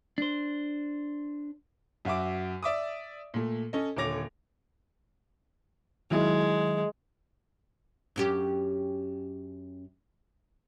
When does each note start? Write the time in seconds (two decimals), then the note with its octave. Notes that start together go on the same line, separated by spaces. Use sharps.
0.18 D4 C5
2.05 F#2 F#4 E5 D6
2.63 D5 E5 D6 D#6
3.34 A#2 A3
3.73 C#4 A4 D#5
3.97 D#1 D3 C#5 D6 A#6 F7
6.11 D#3 F#3 G#3 E4
8.16 F#2 C#4 G4